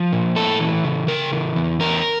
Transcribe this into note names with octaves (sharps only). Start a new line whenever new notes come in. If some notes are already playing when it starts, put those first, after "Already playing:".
Already playing: F3
A#2
A3 A4
E3
C#3
C#3 A#4
E3
E2
E2 A#4